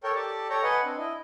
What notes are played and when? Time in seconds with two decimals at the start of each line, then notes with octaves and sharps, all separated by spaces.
0.03 A4 A#4 C#5 G5
0.15 G4 A4 D5 A5
0.50 A4 C#5 G5 A#5
0.63 B4 D#5 F#5 G#5
0.84 C4 D4
0.99 E4 D#5